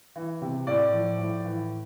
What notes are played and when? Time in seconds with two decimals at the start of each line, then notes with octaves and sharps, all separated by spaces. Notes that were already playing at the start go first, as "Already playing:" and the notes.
0.16 E3
0.42 C3
0.67 A2 D5
0.93 F3
1.18 A2
1.45 E3